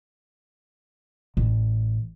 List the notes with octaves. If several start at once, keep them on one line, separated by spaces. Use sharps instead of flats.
A1